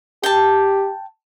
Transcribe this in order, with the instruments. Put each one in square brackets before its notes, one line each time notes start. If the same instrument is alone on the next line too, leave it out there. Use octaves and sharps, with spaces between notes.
[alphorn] G4 [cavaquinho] G5 A5